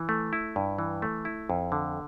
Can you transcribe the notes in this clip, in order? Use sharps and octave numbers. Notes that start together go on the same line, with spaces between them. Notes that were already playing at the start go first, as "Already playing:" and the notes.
Already playing: E3
A3
E4
G2
E3
A3
E4
F2
D3